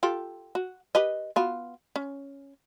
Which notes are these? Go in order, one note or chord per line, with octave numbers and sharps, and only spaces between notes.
F4 G4 A4
F#4
G4 B4 D#5
B3 F4 F#4
C#4